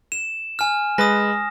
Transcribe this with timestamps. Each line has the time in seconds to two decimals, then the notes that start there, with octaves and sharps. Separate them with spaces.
0.12 E7
0.59 G#5 F6
0.98 G#3 B4 D#6 A#6